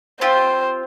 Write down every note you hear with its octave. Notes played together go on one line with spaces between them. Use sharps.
C4 F4 G4 C5